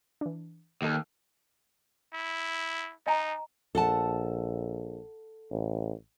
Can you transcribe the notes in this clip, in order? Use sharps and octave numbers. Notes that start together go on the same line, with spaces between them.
E3 D4
D#2 A4 D#5 F5
E4
D#4 D#5 G#5 A#5
A#1 A4 F#5 A5
A1